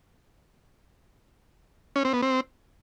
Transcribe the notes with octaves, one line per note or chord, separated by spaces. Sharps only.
C#4
C4
B3
C4